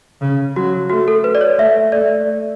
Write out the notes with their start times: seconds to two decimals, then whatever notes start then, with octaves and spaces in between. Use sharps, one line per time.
0.21 C#3
0.56 F#3 F#4
0.89 A3 F#4
1.08 A4
1.24 B4
1.35 D5
1.41 C#5
1.58 A3 E5
1.92 A3 D5